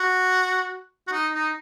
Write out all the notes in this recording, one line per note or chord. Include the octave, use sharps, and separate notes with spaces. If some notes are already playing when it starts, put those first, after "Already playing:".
Already playing: F#4
F#4
D#4
D#4